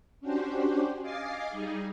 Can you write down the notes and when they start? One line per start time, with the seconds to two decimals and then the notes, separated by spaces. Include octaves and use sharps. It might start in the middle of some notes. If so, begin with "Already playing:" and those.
0.21 C#4 D4 F#4 G4 C5
1.02 D#5 F5 G#5 D6 A6 C7
1.49 G3 D#4 G#4